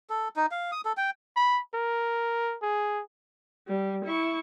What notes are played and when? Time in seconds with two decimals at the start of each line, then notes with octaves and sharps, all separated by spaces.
0.10 A4
0.36 D#4
0.51 F5
0.72 D#6
0.85 A4
0.97 G5
1.36 B5
1.74 A#4
2.62 G#4
3.68 G3
4.04 E4 C#6